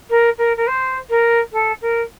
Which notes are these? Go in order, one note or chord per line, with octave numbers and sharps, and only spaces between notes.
A#4
A#4
A#4
C5
A#4
A4
A#4